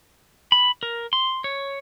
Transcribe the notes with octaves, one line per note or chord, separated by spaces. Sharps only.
B5
A#4
C6
C#5